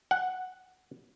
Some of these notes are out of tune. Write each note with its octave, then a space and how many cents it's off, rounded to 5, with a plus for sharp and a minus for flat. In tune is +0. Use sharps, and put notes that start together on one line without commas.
F#5 +0